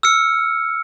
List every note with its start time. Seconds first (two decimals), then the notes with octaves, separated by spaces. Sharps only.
0.03 E6 F6 C#7